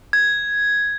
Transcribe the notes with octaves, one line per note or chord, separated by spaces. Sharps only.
G#6